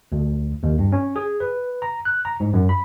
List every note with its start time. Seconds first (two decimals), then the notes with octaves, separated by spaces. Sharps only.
0.12 D2
0.63 D#2
0.79 G2
0.92 C#4
1.16 G#4
1.40 B4
1.82 A#5
2.05 F#6
2.25 A#5
2.40 G#2
2.53 F#2
2.69 B5